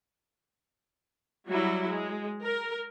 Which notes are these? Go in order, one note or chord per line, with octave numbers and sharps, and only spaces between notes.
F#3 G3 E4
G#3
A#4